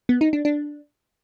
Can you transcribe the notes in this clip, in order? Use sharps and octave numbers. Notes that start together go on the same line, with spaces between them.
B3
D#4
D4
D4